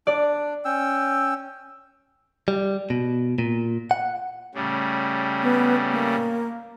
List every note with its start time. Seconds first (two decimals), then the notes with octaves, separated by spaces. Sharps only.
0.07 D4 D5
0.65 C#4 G5 E6
2.48 G3
2.90 B2
3.38 A#2
3.91 F#5
4.55 A2 C#3 G3
5.42 B3
5.92 A#3